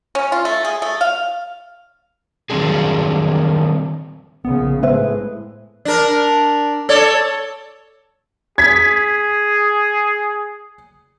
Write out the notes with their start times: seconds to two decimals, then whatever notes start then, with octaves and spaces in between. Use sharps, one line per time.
0.15 C#4
0.32 F4
0.45 A3
0.65 G#4
0.82 A3
1.01 F5
2.50 D#3 F#3 G3 C4 D4 G#4
4.45 A#1 C#3 B3
4.83 A2 G#3 B3 B4 C5 E5
5.85 D4 A#4
6.89 A4 C#5 D5
8.58 G#4 G#6 B6